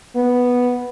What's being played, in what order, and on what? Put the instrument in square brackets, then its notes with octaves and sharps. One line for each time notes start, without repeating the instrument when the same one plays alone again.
[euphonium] B3